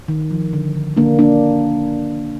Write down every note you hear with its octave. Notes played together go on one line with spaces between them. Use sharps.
D#3
F3
D3
D3
D3 A#3 D4
A#3 D4